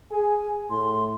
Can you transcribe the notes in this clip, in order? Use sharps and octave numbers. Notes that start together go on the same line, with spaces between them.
G#4 G#5
A2 C6